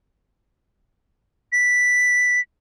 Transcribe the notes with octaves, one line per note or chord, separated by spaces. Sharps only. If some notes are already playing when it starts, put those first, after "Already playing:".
B6